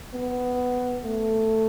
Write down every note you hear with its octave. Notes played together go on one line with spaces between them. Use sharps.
B3
A3